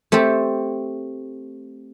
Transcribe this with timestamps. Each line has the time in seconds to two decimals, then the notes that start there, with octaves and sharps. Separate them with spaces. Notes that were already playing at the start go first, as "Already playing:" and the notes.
0.12 A3 C4 G4 A4